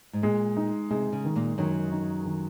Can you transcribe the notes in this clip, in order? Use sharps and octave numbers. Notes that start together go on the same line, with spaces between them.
G#2
A#2 G#3
D#4
C3 G#3
C#3
D#3
A#2 A#3
F#2 D#3 F#3
D#4
D#3